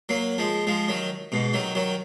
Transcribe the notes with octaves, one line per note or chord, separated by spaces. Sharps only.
F#3 A#3
F3 G#3
F3 G#3
D#3 F#3
G#2 B2
D#3 F#3
D#3 F#3